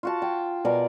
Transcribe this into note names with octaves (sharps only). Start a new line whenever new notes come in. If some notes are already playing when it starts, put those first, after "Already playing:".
F4 F#4 A5
G5
B2 A#4 D5 G#5